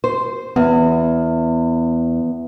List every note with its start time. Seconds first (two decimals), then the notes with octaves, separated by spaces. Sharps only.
0.04 C5
0.56 E2 B3